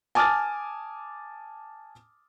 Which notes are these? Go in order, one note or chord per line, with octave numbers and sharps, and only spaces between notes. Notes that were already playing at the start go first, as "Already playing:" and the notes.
G#5 A5 D6 D#6 F6 A6